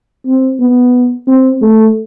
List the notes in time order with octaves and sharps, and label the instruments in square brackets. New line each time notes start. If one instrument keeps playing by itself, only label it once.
[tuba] C4
B3
C4
A3